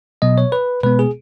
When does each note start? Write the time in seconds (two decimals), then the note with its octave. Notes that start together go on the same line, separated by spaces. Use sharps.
0.22 B2 F#3 B3 D#5
0.38 C#5
0.52 B4
0.83 B2 G#3 B3 B4
0.99 G#4